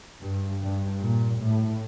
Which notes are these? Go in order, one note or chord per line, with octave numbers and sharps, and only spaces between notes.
G2
G2
A#2
A2